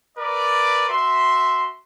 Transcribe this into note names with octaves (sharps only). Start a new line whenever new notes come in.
A#4 B4 D5
F#4 E5 C6